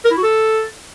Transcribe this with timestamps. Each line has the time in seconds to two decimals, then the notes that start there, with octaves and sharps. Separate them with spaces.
0.05 A#4
0.11 E4
0.17 F#4
0.23 A4